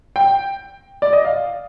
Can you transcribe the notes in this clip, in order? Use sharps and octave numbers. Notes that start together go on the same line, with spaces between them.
G5
D5
D#5
F5